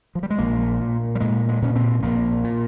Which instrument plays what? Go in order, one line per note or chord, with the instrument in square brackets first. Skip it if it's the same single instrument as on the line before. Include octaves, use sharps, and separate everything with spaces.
[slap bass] F3
G3
G#3
A#1 A#3
A#2
G3
A#2 G#3
G#3
A#2 C#4
C4
A#1 A#3
A#2